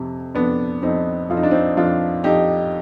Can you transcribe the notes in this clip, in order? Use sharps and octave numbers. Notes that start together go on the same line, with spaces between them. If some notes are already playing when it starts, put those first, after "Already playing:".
Already playing: F2 C3
F2 B3 D4
F2 C4 D#4
F2 F4
D#4
D4
C4 D#4
F2 D4 F4
F2 D#4 G4